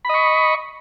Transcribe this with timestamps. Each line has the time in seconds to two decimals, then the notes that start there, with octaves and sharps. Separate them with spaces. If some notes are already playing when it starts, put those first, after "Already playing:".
0.05 B5
0.09 D#5
0.14 C#6